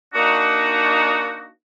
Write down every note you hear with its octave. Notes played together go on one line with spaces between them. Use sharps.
A#3 D4 D#4 F#4